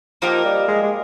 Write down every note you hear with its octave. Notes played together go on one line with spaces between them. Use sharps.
F3 A#3 D#4 G4 A#4
G3
G#3
G#3